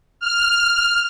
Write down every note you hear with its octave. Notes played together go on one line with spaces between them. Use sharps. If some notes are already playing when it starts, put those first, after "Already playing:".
F6